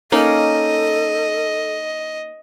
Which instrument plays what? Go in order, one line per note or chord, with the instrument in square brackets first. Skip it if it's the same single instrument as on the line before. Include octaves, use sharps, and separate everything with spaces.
[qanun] A#3 C#4 D#4 [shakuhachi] A4 [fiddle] D#5